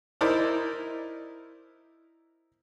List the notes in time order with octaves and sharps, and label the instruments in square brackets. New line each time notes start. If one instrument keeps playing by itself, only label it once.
[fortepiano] D#4 E4 A#4 C5 D5